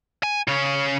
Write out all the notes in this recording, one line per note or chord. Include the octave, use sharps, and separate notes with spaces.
G#5
C#3 C#4